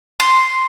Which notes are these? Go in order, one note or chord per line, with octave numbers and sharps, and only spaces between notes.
C6